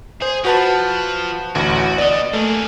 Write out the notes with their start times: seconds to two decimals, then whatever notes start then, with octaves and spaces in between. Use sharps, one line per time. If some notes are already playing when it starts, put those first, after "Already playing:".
0.22 G#4 C5
0.45 F3 F#4 B4 A5
1.55 A1 D2 F#4
1.98 B3 D5 D#5
2.33 A3 A#3 G#4